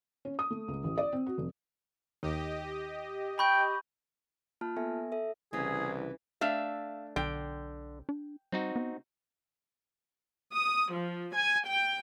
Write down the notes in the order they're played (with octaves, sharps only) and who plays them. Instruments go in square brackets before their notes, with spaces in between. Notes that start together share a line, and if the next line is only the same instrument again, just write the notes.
[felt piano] C#4
D#6
A3
C#2
A1
D5
C4
F#4
F1
[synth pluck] D#2 [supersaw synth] G4 D#5
[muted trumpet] G5 [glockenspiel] B5 C#6 G6
[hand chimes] A#3 F4 A5 F6
B3 A4 E5 G#5
A4 E5
[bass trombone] C2 [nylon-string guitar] C#3 E3 [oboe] G#4
[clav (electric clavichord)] A3 D4 [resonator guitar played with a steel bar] E5 F5
[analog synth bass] B1 [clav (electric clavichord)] D3 [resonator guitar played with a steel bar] G5
[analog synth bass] D4
[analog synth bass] G3 [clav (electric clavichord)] C4 D#4 F#4
[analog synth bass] B3
[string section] D#6
F3
G#5
G5